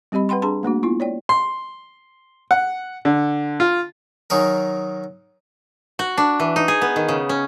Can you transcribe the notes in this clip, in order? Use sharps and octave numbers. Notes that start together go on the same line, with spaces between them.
G3 C4 G4 D#5 B5
B4 F#5 G5 B5 C6
D4 G#4 A5 A#5 C6
A3 A#3 D4 F#4
B3 E4 F4
C#5 D5 G5
C6
F#5
D3
F4
D#3 F#3 G#4 A#4
F#4
D4
E3
D#4
G#4
B3
D#3
C#3
C#4